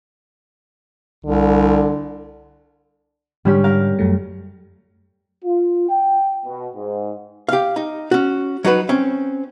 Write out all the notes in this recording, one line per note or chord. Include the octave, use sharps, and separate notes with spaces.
C2 D3
G#2 D3 G3 C#4 G4
A#4 F5
F#2 F#3 A3
F4
G5
B2
G#2
G4 F5
D#4
C#4 F#4
F#3 D#4 F#4 B4
C4 C#4